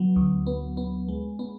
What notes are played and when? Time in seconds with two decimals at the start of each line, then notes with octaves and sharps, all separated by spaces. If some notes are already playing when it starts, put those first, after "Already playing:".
Already playing: F#3 B3
0.16 D2
0.46 B3
0.77 B3
1.08 G#3
1.39 B3